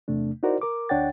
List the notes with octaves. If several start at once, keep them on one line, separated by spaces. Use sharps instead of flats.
E2 C3 A3 D4
D#4 E4 F#4 A#4 C5 D5
A#4 D6
D2 D4 C#5 F#5 G5 A6